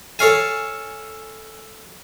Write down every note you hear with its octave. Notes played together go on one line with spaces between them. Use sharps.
A4 C#5 F5 G#5